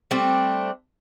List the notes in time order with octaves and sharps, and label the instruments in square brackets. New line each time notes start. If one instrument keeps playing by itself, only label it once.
[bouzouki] G3 A3 C4 D4